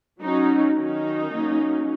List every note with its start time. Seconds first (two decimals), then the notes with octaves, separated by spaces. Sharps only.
0.21 F#3 C#4 D#4
0.77 D#3 F#3 C#4 D#4
1.33 F#3 A#3 C#4